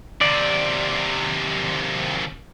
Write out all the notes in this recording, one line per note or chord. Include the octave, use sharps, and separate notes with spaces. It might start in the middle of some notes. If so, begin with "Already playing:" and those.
D#2 C3 D5